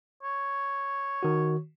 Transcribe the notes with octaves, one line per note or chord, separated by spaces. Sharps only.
C#5
D#3 F#4